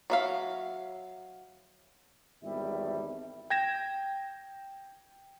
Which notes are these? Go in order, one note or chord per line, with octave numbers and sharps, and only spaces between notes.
F#3 E5 F5
G#1 E2 G3 E5
G5 G#6 A#6 E7